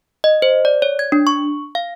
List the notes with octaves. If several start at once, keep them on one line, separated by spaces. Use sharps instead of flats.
D#5
C5
D5
C#5
G#6
D4
C#6
F5